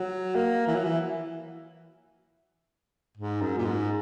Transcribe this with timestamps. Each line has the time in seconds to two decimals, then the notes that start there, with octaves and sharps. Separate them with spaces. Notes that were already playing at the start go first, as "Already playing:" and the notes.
Already playing: F#3
0.35 A#3
0.67 E3
0.75 F#3
0.84 E3
3.18 G#2
3.42 F#2
3.58 A#2
3.65 G#2